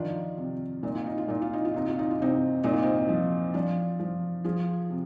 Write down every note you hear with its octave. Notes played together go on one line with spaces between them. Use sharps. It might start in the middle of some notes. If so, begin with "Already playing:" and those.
Already playing: D#3 F3 D4 F4
C3
A#2 D#4
F4
D#4
F4
A#2 D#4
F4
D#4
F4
C3 D#4
F4
D#4
F4
C3 C4 D#4
A#2 D#4
F4
C4 D#4
F3
F3 D4 F4
F3
F3 F4 G#4
C3